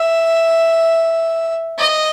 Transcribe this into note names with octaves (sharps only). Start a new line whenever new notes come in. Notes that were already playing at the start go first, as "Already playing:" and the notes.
Already playing: E5
D#5